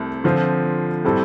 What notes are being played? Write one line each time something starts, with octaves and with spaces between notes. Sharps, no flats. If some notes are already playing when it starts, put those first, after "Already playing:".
Already playing: C2 C3 A3
D3 F3 C4 F4
A2 G3 C4 A4